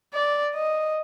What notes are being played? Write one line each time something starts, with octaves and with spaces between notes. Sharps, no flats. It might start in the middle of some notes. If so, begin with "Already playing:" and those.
D5
D#5